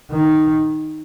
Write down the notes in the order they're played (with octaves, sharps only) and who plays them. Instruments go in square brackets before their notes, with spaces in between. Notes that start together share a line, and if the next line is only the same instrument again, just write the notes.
[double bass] D#3